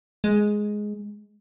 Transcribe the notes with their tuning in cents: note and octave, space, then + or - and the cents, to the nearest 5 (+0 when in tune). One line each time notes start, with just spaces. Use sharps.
G#3 +5